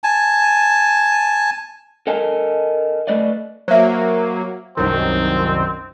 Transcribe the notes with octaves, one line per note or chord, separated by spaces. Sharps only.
G#5 A5
A4 A#4 D#5 G#5 A5
A3 B4 D5 D#5
F#3 A#3 C5 E5
C2 F#2 D#3 C4